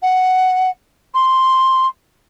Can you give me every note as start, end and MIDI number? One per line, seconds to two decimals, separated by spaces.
0.02 0.70 78
1.14 1.87 84